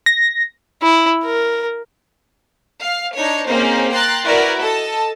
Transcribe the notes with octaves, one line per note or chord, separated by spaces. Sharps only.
A#6
E4
A#4
F5
D4 D#4 C#5
A#3 C4 C#4 D#4 G#4 C5
G5 A#5 C6 F#6 A6
E4 F#4 A#4 B4 D5
A4 D#5 A5